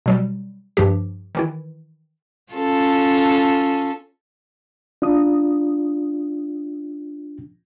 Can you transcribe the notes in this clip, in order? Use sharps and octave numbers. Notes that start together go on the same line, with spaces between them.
B2 F#3 G3
G2 F3 G4
D#3 E3 E4
C#4 F4 A4
D4 F4 D#6